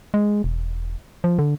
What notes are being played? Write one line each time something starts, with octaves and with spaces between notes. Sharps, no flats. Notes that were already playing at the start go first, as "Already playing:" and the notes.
G#3
E1
F3
D3